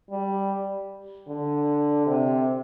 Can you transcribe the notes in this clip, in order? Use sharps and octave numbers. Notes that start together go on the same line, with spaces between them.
G3
D3
C3